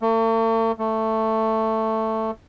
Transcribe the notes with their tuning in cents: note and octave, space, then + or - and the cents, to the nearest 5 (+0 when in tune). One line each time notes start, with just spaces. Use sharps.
A3 +45
A3 +10